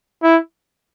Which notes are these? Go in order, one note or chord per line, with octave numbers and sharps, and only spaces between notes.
E4